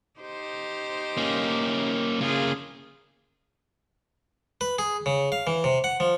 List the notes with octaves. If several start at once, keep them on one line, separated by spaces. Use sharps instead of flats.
D#4 G4 C5
A#3 C#4
C#3 A#3 F4 G#4
B4
G#4
C#3
F5
E3
C3
F#5
F3